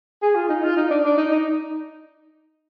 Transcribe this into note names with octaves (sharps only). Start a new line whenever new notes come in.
G#4
F4
D#4
F4
D#4
D4
D4
D#4
D#4